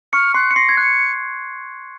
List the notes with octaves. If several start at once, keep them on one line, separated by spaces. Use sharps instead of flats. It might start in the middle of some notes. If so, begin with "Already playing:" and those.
C#6 F6 C#7
C6 F#6 C7
C#7
C6 A#6 C7
G#6
F#6 C#7